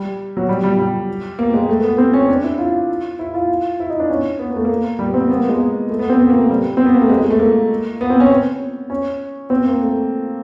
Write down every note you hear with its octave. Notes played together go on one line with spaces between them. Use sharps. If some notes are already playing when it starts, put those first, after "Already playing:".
Already playing: G3
F#3
G3
G3
G3
A#3
G#3
A3
B3
C4
C#4
D4
E4
F4
E4
F4
E4
D#4
D4
C#4
B3
A#3
A3
A#3
G3
B3
C4
A#3
B3
A#3
G#3
A3
B3
C4
B3
A#3
A3
G3
C4
B3
A#3
A3
G#3
G#3
A3
A#3
B3
C4
C#4
C#4
C4
A#3
A3